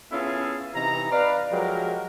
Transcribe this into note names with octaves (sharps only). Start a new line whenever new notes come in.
B3 C#4 E4 F4 G#4 A4
C3 E3 D#4 A#5
B4 D5 F5
F3 F#3 G#3 G4 A#4